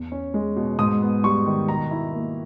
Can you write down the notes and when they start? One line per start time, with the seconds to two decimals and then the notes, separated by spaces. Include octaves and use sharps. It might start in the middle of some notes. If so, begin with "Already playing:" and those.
Already playing: E2
0.12 C#4
0.34 G#3
0.56 B2
0.79 G#2 D#6
1.02 B3
1.24 G3 C#6
1.46 D#3
1.68 B2 A#5
1.91 E4
2.13 A#3